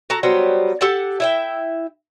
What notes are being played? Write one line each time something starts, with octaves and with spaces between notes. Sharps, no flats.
F#4 A4 A5 A#5
F#3 G3 B3 C5
G4 A4 F#5 A5
E4 E5 G5